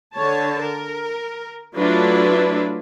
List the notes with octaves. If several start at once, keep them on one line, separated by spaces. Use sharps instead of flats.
D3 C#5 A5
A#4
F#3 A3 D4 E4 F4 B4